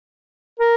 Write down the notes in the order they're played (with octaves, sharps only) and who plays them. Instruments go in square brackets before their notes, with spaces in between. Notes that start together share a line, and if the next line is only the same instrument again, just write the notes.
[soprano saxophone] A#4